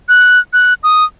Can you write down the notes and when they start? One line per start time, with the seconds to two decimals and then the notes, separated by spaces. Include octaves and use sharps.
0.09 F#6
0.53 F#6
0.83 D#6